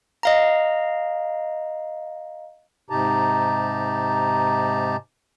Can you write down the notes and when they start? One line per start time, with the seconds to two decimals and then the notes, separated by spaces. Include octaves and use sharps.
0.23 D#5 F5 A#5
2.90 G#2 C3 D#4 G4 A5 A#5